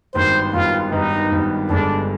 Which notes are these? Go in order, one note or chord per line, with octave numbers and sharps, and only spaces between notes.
G#1 G2 D#3 B3 C5
G#1 G2 D#3 B3 F4
G#1 G2 D#3 B3 D#4
G#1 G2 D#3 B3
G1 G2 D3 G#3 D4